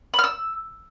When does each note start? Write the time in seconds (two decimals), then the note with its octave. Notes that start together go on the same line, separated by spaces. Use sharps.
0.14 B5
0.19 F6
0.24 E6